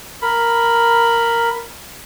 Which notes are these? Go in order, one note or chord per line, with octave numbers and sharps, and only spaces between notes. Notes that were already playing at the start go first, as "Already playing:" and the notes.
A#4 B5